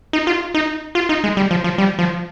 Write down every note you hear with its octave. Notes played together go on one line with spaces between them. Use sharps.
D#4
F4
D#4
F4
D#4
G#3
G3
F3
F3
G3
F3